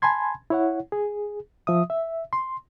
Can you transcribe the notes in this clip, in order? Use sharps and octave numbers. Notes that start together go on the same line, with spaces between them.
G#5 A5 B5 C6 G#6
E4 C#5 F#5
G#4
F3 E5 D#6
E5
C6